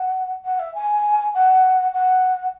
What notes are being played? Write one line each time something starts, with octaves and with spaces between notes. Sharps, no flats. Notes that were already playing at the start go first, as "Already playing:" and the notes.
Already playing: F#5
F#5
E5
G#5
F#5
F#5